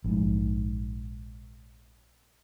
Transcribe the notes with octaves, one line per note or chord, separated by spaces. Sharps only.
A#1 G#2